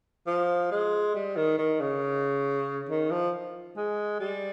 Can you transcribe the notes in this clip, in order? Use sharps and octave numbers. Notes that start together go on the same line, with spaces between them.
F3
G#3
G3
D#3
D#3
C#3
D#3
F3
G#3
G3